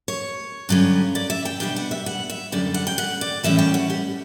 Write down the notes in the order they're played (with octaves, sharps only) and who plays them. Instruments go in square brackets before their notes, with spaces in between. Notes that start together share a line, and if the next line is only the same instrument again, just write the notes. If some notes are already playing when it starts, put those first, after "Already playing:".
[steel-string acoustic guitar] C#5
G2 D3 F#3 C#4
D5
E5
G5
B2 G3 B3 D4 G5
F#5
E5
F#5
E5
F#2 D3 G3 D5
F#5
G5
F#5
D5
A2 E3 G3 C#4 E5
G5
F#5
G4